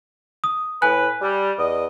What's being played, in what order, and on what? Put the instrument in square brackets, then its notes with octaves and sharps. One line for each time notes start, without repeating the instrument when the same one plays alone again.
[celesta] D#6
[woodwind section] A2 B4 [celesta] G#5 F#6
[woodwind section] G3
E2 D5 D#5